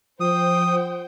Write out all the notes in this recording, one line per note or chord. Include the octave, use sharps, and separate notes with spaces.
F3 C5 G5 D#6